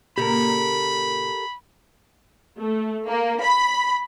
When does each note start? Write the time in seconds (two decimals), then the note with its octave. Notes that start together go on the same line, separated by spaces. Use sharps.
0.18 A#2 C#3 A#3 G4 A4 A#4 B5
2.58 A3
3.08 A#3
3.43 B5